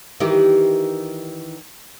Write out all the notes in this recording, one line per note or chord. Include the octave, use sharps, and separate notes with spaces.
D#3 E3 G4